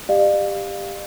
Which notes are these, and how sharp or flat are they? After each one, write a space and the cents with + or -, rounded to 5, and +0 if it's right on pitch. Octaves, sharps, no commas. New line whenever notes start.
G4 +15 D5 +45 F5 +0